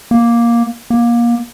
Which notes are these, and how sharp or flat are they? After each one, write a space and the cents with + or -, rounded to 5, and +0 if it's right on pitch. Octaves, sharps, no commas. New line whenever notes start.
A#3 +10
A#3 +25